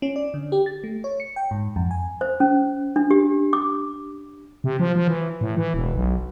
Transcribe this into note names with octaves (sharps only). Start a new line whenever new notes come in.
C#4
D5
D3
G4
A6
A3
C#5
C#7
G5
G#2
F2
G#5
C5
C#4
D4
G4
D6
C3
F3
F3
E3
A2
E3
E1
B1